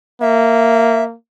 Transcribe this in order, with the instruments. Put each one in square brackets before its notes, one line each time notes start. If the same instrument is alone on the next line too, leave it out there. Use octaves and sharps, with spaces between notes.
[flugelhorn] A#3 [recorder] E5